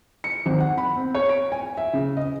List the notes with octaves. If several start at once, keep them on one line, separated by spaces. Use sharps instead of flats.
C#7
G#1
F#5
B5
C4
C#5
D7
G#5
E5
C#3
D#5